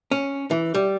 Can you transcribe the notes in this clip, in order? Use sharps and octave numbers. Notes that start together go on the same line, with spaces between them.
C#4
E3
G3